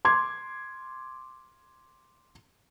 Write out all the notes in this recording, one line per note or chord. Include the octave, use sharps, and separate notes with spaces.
C6 D6 G#6